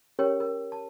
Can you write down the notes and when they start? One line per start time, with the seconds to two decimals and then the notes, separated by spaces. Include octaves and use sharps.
0.19 C#4 G4 A#4 C#5 G5
0.40 A#4
0.72 A5